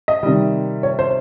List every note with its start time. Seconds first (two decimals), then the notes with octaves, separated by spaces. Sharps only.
0.08 D#5
0.23 C3 D#3 G3
0.83 C#5
0.99 C5